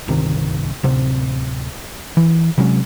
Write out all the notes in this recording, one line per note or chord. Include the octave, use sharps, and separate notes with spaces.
G1 C2 C3 D#3
D1 C3 C4
E3
C3 F#3 G#3 C#4